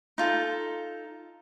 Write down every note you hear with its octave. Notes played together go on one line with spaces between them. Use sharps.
D#4 F4 A4